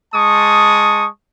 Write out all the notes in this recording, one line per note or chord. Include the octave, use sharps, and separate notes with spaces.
G#3 A5 C#6 D#6